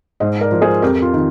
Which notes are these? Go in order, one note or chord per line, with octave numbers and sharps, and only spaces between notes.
G#2 C5 D#5
A#4 D5
F3
G#4 C5
F2 G4 A#4
F4
D#3